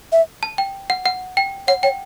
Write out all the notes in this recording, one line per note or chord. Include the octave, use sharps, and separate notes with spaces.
E5
A5
G5
F#5
F#5
G5
C#5 F#5
C#5 G5